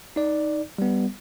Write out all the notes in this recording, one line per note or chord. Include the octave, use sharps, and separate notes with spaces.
D#4 D5
G3 B3